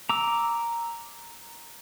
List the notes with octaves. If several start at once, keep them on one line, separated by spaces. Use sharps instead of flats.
A#5 D6 E6